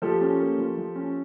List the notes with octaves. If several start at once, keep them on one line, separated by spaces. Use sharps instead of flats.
F3 G4 A4
C#4
A#3
F3
F3
C#4